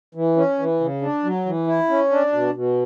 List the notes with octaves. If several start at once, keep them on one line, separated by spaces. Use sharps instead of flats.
E3
C#4
E3
C#3
D4
F#3
E3
E4
C#4
D4
B2
B2